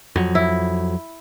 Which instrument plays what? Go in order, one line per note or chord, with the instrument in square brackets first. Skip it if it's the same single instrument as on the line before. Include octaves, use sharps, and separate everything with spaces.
[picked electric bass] F2 F#3
[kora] E4